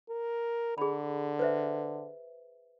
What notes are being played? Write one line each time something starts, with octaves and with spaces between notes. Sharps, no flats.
A#4
D3 G#4 B5
B4 C5 E5